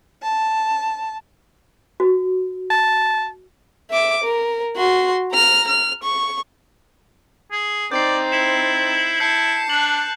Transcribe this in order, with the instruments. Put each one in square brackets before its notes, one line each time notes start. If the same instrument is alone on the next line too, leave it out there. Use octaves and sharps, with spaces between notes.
[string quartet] A5
[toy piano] F#4
[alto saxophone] A5
[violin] E5 D6
A#4
F#4 C6
A#5 F6
F6
C#6
[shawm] G#4
[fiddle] C4 D#4 [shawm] D5 [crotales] G6 A6 C7
[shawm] E4 [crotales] E7
[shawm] E4 [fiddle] A5 [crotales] G6 C7 C#7
[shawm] D4 [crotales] F#6 F#7